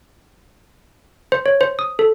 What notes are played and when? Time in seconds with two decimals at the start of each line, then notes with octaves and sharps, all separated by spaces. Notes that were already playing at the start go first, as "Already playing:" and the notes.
1.32 C5
1.46 C#5
1.61 C5
1.79 D#6
1.99 A4